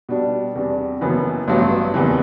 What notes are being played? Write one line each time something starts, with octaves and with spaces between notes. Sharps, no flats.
B2 G3 D4
E2 C3 G3 D4
F#1 F#2 E3 B3
A1 G2 F#3 B3
F#1 E2 C3 E3